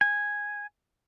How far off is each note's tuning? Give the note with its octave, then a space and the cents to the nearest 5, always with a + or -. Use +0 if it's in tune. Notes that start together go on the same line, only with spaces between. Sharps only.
G#5 -5